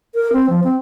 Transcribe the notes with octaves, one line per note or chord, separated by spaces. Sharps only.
A#4
C4
F3
C4